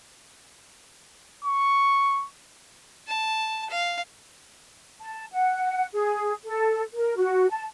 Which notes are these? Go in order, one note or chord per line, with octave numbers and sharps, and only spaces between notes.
C#6
A5
F5
A5
F#5
G#4
A4
A#4
F#4
A5